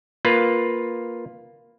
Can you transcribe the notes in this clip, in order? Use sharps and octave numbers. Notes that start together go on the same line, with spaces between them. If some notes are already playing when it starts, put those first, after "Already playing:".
A#3 F4 B4